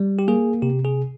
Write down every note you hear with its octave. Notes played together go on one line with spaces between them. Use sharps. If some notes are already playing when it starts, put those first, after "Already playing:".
Already playing: G3
G4
A#3 G#4
C3 G4
G#4